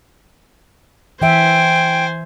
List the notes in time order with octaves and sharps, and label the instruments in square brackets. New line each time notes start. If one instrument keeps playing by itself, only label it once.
[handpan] E3 E5 [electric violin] C5 G#5 [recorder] G5